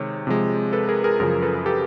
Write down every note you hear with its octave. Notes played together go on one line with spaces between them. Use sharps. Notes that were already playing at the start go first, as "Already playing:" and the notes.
Already playing: C3 D#3 G#3 C#5
C3 F3 G#3
A4 B4
G#4 A#4
G#4 A#4
F#2 C#3 F3 G#4 A#4
A4 B4
G4 A4